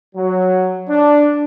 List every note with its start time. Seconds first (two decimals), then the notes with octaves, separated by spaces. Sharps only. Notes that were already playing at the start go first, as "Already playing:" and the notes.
0.15 F#3
0.88 D4